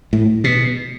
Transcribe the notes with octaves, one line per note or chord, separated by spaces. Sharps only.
A2
B2